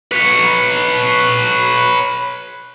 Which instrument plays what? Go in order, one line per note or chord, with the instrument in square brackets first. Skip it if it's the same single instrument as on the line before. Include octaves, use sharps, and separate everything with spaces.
[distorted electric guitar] B4 C#5